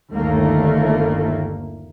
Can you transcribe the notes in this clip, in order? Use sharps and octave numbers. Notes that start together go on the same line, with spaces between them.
G1 D#2 A3 A#3